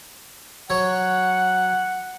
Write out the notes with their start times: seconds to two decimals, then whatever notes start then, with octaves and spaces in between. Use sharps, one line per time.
0.70 F#3 C#5 F#5